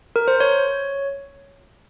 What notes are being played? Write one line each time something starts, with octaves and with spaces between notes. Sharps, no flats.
A#4
C5
C#5